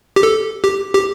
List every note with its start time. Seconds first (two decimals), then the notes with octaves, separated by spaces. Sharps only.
0.16 G4
0.23 A4
0.64 G4
0.94 G4